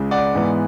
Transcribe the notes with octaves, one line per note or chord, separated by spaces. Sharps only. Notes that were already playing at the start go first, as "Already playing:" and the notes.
Already playing: C#2 C#3 G#3
D5 F#5
G#2 E3 G#3 B3